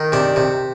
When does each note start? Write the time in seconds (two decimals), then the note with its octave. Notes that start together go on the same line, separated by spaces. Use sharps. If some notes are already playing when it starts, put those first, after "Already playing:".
Already playing: D#3
0.12 C3 D4
0.36 C3